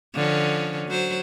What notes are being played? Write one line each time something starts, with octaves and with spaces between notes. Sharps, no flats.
D3 F3 C#4
F#3 C5